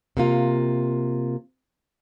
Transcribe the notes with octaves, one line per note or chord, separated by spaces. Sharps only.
C3 A#3 F4